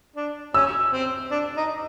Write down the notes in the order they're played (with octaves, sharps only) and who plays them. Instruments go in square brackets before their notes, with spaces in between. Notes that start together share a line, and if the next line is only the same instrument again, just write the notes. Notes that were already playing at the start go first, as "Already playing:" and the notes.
[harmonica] D4
[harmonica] C#4 [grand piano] E6
[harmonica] C4
D4
D#4